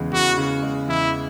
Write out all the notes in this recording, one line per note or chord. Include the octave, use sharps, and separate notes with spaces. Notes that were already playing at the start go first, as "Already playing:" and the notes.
Already playing: E2 C#3 G#3
E2 F#4
C#3
G#3
E2 E4